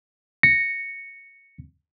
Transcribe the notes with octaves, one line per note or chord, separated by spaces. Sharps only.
A#6 C#7